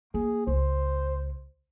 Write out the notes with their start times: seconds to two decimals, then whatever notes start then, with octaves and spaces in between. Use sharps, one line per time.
0.14 A#3 G#4
0.47 C#2 C5